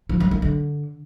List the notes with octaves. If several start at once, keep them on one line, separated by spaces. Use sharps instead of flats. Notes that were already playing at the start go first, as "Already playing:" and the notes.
F3
F#3
A#3
D3